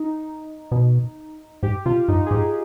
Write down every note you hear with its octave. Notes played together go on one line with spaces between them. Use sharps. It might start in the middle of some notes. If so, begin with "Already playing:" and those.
Already playing: D#4
B2
G#2 G4
C3 F4
G2 D#4
G#4
G#2 G4